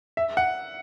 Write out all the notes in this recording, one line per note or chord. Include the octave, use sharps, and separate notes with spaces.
E5
F#5